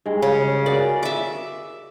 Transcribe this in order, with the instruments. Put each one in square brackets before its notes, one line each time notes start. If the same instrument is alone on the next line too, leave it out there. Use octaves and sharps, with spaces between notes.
[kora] G2 G#3
[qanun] C#3 C#4
[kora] F#4 G#4 A#4 [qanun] D5
[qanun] E5 D6